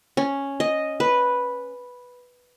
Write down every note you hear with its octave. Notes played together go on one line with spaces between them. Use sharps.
C#4
D#5
B4